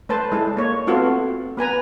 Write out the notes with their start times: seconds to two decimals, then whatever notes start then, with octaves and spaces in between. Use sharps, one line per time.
0.09 A3 B4 C5 A5
0.32 G#3 E4 A4
0.57 A#3 C#5
0.87 A3 B3 C4 F4 F#4 A4
1.57 B3 B4 G#5 A#5